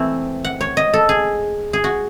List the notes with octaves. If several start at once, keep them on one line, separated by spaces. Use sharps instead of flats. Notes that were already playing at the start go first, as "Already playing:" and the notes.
Already playing: E3 A3 C4 E4 E5
F#5
C#5
D#5
A4
G#4
G#4
F#4